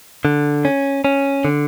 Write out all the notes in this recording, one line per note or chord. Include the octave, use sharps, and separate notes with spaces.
D3
C#4
C#4
D3